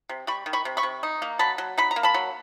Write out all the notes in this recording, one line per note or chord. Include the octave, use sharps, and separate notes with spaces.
C3
G3 B5 C#6
D#3
B5 C#6
C3
B5 C#6
C3
D#4
A#3
F#3 A5 B5
F#3
D#4 B5
A#5
A#3
A5 B5
F#3